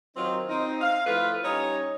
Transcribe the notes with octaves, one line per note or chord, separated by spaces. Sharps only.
D#3 F#3 C4 D#4 F4
C4 D#4
F5
F3 A3 E4 F4 B4
G3 C#4 D#4 C#5